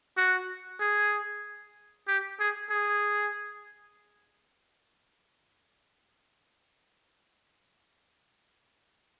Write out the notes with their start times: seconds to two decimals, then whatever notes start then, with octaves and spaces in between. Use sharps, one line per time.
0.17 F#4
0.80 G#4
2.08 G4
2.40 G#4
2.70 G#4